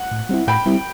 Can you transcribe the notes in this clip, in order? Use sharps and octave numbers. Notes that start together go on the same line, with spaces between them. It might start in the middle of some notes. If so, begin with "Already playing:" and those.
Already playing: F#5
A2
G3 C4 E4
A2 G5 B5
G3 C4 E4